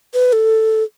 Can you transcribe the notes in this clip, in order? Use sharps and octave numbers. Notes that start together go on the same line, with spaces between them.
B4
A4